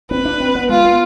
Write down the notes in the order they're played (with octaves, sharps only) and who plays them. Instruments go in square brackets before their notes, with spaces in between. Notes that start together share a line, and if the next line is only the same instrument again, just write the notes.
[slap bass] C4 [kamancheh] B4
[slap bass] D4
C4
B3
[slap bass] G#3 [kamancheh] F4
[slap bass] B3